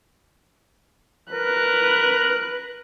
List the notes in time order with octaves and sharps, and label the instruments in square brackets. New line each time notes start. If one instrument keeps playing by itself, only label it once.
[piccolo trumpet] A#4 [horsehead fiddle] B4 [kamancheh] F#6